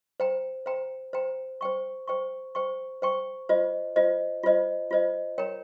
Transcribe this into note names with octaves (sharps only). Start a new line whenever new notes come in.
C5 G5 A#5
C5 G5 A#5
C5 G5 A#5
C5 G5 C#6
C5 G5 C#6
C5 G5 C#6
C5 G5 C#6
F4 C5 D#5
F4 C5 D#5
F4 C5 D#5
F4 C5 D#5
A#4 C#5 G5 A#5